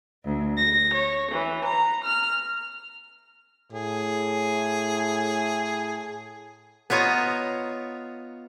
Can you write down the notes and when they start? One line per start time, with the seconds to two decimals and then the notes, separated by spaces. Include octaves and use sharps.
0.25 D2
0.57 A#6
0.94 C#5
1.31 E3
1.66 A#5
2.03 F6
3.73 A2 G#4
6.90 B3 F4 C#5 D#5 A#5